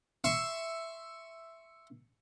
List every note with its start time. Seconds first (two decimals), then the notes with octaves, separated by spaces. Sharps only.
0.24 E5 C6 C#6